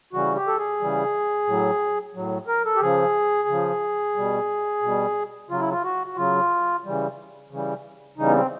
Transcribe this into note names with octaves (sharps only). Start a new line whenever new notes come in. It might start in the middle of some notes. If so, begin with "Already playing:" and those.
C#3 E3 G3 F#4
G4
A4
G#4
C#3 E3 G3
A2 F#3
A2 F#3
A#4
A4
G4
C#3 F3 G#4
C#3 F3
B2 G3
B2 G3
C#3 F#3 F4
E4
F4
F#4
F#4
C#3 F#3 F4
C#3 E3 G3
C#3 E3 G3
C#3 E3 G3 D#4
B3
C4